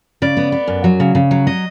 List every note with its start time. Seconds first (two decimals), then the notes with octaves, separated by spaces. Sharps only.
0.22 C#3 D5
0.37 B3
0.52 B3
0.67 F#2
0.84 F#3
1.00 C#3
1.15 C#3
1.31 F#3
1.47 D#5